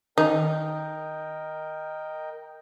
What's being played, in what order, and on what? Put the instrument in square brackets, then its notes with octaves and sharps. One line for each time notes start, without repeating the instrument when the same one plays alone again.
[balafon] D#3 [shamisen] D#4 [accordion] A#4 D#5 G5